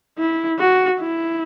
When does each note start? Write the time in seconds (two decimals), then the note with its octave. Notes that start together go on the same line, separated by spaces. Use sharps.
0.18 E4
0.59 F#4
1.00 E4